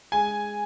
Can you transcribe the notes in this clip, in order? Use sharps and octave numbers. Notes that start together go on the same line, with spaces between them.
G#3 G#5